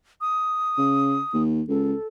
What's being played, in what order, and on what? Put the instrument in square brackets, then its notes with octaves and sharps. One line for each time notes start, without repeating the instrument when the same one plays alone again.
[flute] D#6
[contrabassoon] C#3
D#2
[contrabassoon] C#2 [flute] A4